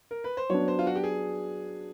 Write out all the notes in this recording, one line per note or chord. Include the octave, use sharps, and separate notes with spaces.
A#4
B4
C5
F#3 B3 D4 C#5
C5
F4
F#4
G4
G#4